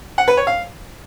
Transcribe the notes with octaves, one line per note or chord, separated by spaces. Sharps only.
F#5
B4
C#5
F5